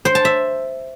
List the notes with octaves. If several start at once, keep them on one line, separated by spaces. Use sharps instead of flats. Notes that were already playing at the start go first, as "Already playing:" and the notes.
C5
A5
E5